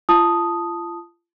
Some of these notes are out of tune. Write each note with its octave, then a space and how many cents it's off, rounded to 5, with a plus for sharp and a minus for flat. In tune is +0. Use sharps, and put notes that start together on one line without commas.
F4 -35 A5 +0 D#6 +0